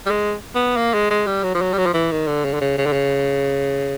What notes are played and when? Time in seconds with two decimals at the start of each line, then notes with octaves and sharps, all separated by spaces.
0.06 G3
0.10 G#3
0.55 B3
0.77 A#3
0.94 G#3
1.11 G#3
1.27 G3
1.43 F#3
1.55 F3
1.61 F#3
1.73 G3
1.78 F#3
1.86 F3
1.94 E3
2.12 D#3
2.27 D3
2.45 C#3
2.54 D3
2.61 C#3
2.78 C#3
2.86 D3
2.93 C#3